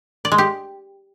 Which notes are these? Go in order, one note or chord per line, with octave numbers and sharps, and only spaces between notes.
D5
G#3
G4